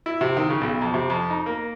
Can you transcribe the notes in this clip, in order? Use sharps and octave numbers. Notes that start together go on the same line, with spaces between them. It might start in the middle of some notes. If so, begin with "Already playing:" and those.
E4
C3
D#3
C#3
B1
F2
C3
F2
D#4
A#3